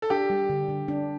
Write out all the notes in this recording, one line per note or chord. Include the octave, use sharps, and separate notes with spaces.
A4
D4 G4
G3
D3
D3
D4